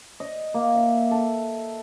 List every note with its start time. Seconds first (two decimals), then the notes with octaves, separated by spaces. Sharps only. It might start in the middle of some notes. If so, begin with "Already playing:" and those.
0.20 D#5
0.54 A#3
0.75 E5
1.11 A4